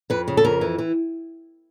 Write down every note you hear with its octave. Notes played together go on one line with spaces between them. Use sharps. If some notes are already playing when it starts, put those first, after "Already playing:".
F2 B4
C#3
A4
F2 A#4
E3
E3